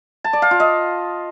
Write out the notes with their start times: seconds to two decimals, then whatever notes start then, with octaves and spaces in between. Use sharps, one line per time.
0.24 A5
0.33 D5
0.42 F5
0.51 F4
0.60 D#5